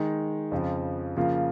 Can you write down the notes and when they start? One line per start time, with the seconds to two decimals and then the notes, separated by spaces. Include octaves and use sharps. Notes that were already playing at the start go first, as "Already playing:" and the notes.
Already playing: D#3 G#3 D#4
0.52 F2 C#3 F3
1.17 C#3 F3 A#3 F4